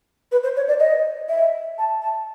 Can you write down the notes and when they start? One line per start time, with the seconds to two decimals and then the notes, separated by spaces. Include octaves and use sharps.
0.32 B4
0.44 C5
0.56 C#5
0.68 D5
0.80 D#5
1.29 E5
1.78 A5
2.02 A5